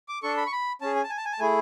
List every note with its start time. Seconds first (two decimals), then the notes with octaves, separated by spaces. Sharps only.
0.08 D6
0.23 D4 A4 C#6
0.37 B5
0.47 C#6
0.52 B5
0.81 C#4 G#4 A5
0.95 G#5
1.04 A5
1.10 G#5
1.17 A5
1.25 G#5
1.33 A5
1.40 A3 E4 G#4 G#5